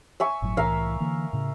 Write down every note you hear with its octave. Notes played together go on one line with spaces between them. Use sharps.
E5 G#5 C#6
G1 A2 F#3
C2 A2 E3 A#4 E5 F5
D3 E3 A#3
A2 C#3